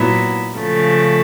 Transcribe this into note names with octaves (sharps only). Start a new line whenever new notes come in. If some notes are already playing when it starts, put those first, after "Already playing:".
Already playing: A#2 F#3 B3 E4
C#3 F3 A3